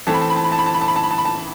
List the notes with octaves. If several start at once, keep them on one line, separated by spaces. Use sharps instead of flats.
E3 A3 C4 A5
B5
A5
B5
A5
B5
A5
B5
A5
B5
A5
B5
A5
B5
A5
B5
A5